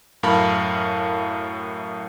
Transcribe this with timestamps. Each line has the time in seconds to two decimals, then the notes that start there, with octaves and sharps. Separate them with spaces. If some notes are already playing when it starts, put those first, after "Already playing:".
0.23 F#2 A2 A#4 F5 A5 B5